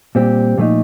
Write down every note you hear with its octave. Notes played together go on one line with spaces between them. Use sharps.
A#2 G3 C4 G4
A#2 F3 A3 D#4